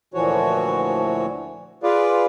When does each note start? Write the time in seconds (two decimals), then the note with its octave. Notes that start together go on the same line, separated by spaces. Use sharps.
0.14 D2 A#2 E3 F3 F#4 C#5
1.83 F4 G#4 B4 D5 F5